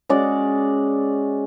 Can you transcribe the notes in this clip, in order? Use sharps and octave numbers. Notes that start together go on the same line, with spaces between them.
G#3 C#4 F#4 D5